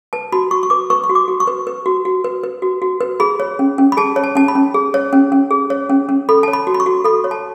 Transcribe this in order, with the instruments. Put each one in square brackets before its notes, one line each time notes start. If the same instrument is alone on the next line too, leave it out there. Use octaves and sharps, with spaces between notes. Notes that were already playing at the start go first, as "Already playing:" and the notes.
[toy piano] B4 A5
F#4 B5
F#4 C#6
C#6
B4 D6
B4 C#6
C#6
F#4
D6
F#4
C#6
B4
B4
F#4
F#4
B4
B4
F#4
F#4
B4
G#4 B5
C#5
C#4
C#4
B5
G#4 A5
C#5
A5
C#4 A5
B5
C#4
G#4
C#5
C#4
C#4
G#4
C#5
C#4
C#4
A4 B5
C#5 A5
B5
F#4
B5
C#6
F#4
A4 B5
C#5
A5